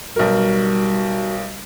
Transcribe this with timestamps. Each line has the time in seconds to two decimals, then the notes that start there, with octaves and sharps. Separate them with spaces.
0.16 B1 G3 F#4 A#4